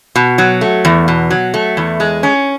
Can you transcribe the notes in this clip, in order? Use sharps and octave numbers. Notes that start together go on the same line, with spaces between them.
B2
F#3
A3
E2
B2
F#3
A3
E2
G#3
C#4